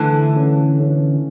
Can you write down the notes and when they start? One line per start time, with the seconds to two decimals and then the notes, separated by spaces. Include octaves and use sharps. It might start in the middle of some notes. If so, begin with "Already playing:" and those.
Already playing: D3 E3 A3
0.36 C#4
0.80 C#4